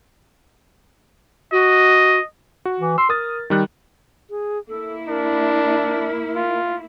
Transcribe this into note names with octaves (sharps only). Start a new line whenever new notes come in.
F#4 D#5
F#4
E3
C6 E6
A#4 D#6 A6
D#3 G3 F#6
G#4
A#3 E4 A4
D4 A#4
F4